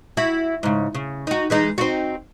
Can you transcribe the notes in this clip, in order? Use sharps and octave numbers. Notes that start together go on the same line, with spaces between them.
E4 F#4
G#2 C#3
C#3
D#4 F#4
E3 G#3 D#4
C4 D#4 F#4